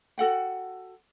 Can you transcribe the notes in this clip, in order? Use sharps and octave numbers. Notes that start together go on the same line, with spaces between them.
F#4 A4 F#5 G5